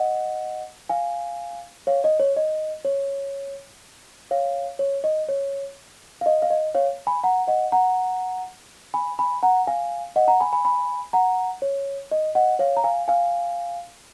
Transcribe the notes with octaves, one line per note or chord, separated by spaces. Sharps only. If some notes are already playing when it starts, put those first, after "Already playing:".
Already playing: D#5 F#5
F5 G#5
C#5 F5
D#5
C#5
D#5
C#5
C#5 F5
C#5
D#5
C#5
F5
D#5
F5
D#5
C#5 F5
G#5 B5
F#5 A#5
D#5 F#5
F#5 A#5
G#5 B5
G#5 B5
F#5 A#5
F5 G#5
D#5 F#5
F#5 A#5
G#5 B5
G#5 B5
G#5 B5
F#5 A#5
C#5
D#5
D#5 F#5
C#5 F5
A#5
F5 G#5
F5 G#5